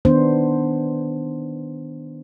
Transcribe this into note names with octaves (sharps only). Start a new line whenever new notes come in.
D#3 B3 D4 C5